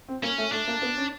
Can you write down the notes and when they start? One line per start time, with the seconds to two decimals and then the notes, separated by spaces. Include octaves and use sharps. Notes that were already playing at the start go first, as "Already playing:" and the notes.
0.08 C4
0.23 A#3 C#4
0.38 A3
0.52 A3 D4
0.68 A#3
0.82 B3
0.97 C#4